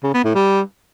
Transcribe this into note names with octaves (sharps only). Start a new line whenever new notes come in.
C#3
B3
A2
G3